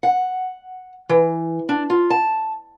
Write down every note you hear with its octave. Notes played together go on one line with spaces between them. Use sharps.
F#5
E3
D4
F4
A5